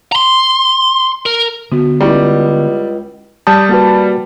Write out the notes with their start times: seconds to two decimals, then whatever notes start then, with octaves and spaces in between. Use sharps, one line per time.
0.12 A#5 C6
1.26 A#4
1.72 D3 B3 F#4
2.01 C#2 G3 C#4 E4
3.47 G3 A5 D#6 G6
3.69 A#3 F#4 B4